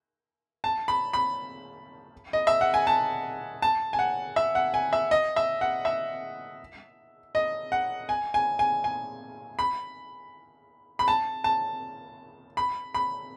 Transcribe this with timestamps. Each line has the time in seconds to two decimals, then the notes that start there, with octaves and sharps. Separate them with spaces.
0.64 A5
0.88 B5
1.13 B5
2.33 D#5
2.47 E5
2.61 F#5
2.74 G#5
2.87 A5
3.62 A5
3.93 G#5
3.99 F#5
4.36 E5
4.55 F#5
4.74 G#5
4.93 E5
5.11 D#5
5.36 E5
5.61 F#5
5.85 E5
7.35 D#5
7.72 F#5
8.09 G#5
8.34 G#5
8.59 G#5
8.84 G#5
9.59 B5
10.99 B5
11.08 A5
11.44 A5
12.57 B5
12.94 B5